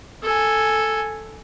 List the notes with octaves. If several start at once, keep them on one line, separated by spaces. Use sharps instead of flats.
A4 G#5